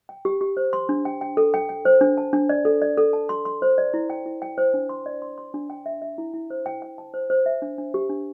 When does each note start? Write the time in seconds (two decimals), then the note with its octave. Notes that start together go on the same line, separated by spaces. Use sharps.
0.09 G5
0.25 G4
0.41 G4
0.57 C5
0.73 C6
0.89 D4
1.05 G5
1.21 G5
1.37 A4
1.54 G5
1.69 G5
1.85 C5
2.01 D4
2.18 A5
2.33 D4
2.49 D5
2.65 A4
2.82 D5
2.98 A4
3.13 A5
3.29 C6
3.45 C6
3.62 C5
3.78 D5
3.94 E4
4.10 G5
4.26 E4
4.42 G5
4.58 C5
4.74 D4
4.89 C6
5.06 D5
5.22 C6
5.38 C6
5.54 D4
5.70 G5
5.86 E5
6.02 E5
6.18 E4
6.34 E4
6.50 C5
6.66 G5
6.82 G5
6.98 A5
7.14 C5
7.30 C5
7.46 E5
7.62 D4
7.78 D4
7.94 G4
8.10 D4